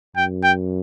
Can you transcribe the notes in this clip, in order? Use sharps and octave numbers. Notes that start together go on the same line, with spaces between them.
F#2 G5
G5